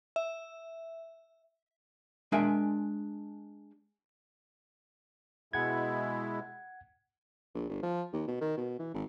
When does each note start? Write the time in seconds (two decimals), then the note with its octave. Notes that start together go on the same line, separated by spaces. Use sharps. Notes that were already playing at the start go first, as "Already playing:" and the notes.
0.16 E5
2.32 G#3 D4 A#4 E5 G5 G#5
5.53 B2 G#3 E4 F#5 G#6
7.55 A#1
7.69 G1
7.83 F3
8.13 D#2
8.28 B2
8.41 D#3
8.57 B2
8.79 E3
8.94 G#1